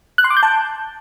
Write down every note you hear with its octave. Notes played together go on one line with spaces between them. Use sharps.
F#6
C6
D6
G6
A5